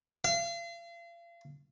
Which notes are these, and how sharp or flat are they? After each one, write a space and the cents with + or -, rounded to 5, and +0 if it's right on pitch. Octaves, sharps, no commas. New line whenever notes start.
F5 -35